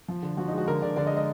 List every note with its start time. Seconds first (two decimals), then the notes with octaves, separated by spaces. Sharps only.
0.08 F3
0.23 D3
0.37 F3 F#4
0.48 G#3 D#4
0.58 F#4
0.67 D3 A#4
0.82 D3 D5
0.96 D3 D5
1.07 D#5
1.11 G#3
1.17 D#5